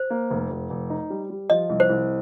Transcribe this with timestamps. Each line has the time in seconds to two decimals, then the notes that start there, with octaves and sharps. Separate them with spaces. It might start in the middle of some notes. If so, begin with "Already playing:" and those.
Already playing: C5
0.10 A#3
0.30 F1
0.50 F1
0.70 F1
0.90 D#4
1.10 G3
1.30 G3
1.50 F3 D#5
1.70 C2
1.80 C5
1.89 C2